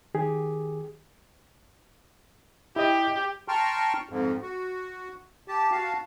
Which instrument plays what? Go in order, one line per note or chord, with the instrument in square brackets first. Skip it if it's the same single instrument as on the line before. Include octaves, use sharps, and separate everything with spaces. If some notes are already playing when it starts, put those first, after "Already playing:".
[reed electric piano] D#3 G4 G#4
[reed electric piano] E4 D#5 [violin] G4
[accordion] G5 A5 A#5 C6 C#6 F6
F2 G#2
F#4
G4 A5
F#4 F5 A5